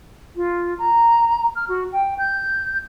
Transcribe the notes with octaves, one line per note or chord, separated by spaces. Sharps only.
F4
A#5
F6
F#4
G5
G6